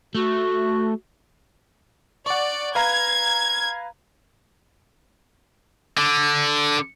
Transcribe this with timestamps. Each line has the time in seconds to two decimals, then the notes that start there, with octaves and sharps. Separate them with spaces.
0.15 A3 F#4
2.26 D5 F#5 C#6
2.75 B4 F5 A#5 G#6
5.98 D3